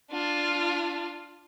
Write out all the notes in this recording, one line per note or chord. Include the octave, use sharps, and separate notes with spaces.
D4 F4